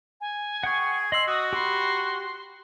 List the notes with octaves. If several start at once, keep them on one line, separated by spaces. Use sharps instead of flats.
G#5
G#4 F#5 G5 C#6
D#5 C6 E6 F#7
F#4 D#6
G4 B5 C6